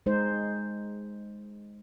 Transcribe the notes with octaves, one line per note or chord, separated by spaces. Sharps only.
G#3 D#4 C5